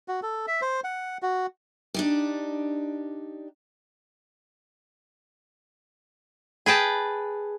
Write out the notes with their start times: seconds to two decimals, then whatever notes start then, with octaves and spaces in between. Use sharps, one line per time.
0.08 F#4
0.23 A4
0.47 E5
0.62 C5
0.84 F#5
1.22 F#4
1.94 D4 D#4 G4
6.66 G#4 B4 G5 A5